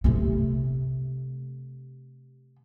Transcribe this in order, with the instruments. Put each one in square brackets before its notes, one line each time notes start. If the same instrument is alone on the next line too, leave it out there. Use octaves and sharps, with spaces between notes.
[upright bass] C3 A3